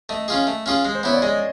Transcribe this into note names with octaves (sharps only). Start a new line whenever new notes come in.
A3 D#5
C#4 F4 G#4
A3
C#4 F4 G#4
G#3
C5
B3 E4 C#5
D5
G#3 D#5